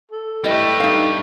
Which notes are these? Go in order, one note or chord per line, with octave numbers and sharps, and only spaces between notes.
A4
G3 A3 E4 G4 B4 D#5
G2 D#4 F5